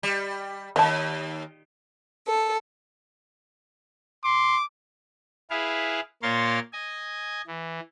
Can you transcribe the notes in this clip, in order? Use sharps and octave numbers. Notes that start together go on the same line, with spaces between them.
G3
D#2 D#5 A5
A4
C6 D6
E4 G#4 B4 F5
A#2 A#3 A#4 C#5 C6 A6
D#5 G#5
E3